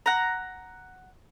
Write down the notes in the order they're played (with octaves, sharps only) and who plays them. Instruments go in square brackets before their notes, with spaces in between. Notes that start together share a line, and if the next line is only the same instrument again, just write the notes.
[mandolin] F#5 A#5